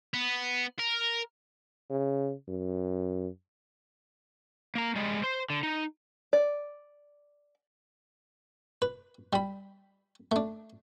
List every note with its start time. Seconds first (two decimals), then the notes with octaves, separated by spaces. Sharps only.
0.14 B3
0.79 A#4
1.90 C#3
2.48 F#2
4.75 A#3 A#5
4.96 G3 G#3
5.24 C5
5.50 D3
5.63 D#4
6.33 D5
8.82 B4
9.33 G3 B5
10.32 A3 D4